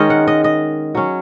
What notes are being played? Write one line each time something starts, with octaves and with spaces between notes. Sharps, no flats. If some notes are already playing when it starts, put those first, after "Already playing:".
Already playing: D#3 G#3 C#4 A#4 C#5 D#5
F#5
D#5
D#5
F#3 C#4